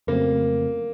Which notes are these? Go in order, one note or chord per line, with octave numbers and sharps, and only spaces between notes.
F2 C#3 F#3 A3 A#3 C4